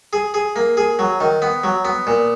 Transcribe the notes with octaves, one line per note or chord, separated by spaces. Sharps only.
G#4
G#4
A#3
G#4
F#3
D#3
B3
F#3
B3
A#2